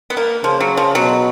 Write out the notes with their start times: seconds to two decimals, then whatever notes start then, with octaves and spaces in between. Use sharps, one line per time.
0.10 B3
0.17 A#3
0.43 C#3 F3
0.60 F#3
0.77 F3
0.95 B2 F#3